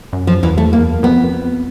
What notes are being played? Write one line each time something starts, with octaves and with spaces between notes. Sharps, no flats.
F#2
F3
E2 E3
A3
A#3
F2 B3